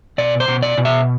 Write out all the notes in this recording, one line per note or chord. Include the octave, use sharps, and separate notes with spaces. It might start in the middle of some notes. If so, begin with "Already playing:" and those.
B2 D5
C5
B2
D5
B2
E5